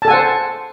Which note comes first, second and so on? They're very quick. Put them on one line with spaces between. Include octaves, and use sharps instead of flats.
A5 A4 G#5 F#5 C5